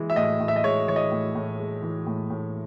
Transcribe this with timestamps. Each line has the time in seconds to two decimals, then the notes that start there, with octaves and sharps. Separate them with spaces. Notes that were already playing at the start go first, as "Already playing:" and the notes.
Already playing: E3 G#3
0.10 E5
0.16 A2 D#5
0.40 A2
0.48 E5
0.56 D#5
0.64 G#3 C#5
0.88 E3 C#5
0.96 D#5
1.12 A2
1.35 A2
1.60 G#3
1.83 E3
2.07 A2
2.30 A2